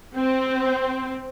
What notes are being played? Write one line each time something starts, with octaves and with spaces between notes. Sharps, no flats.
C4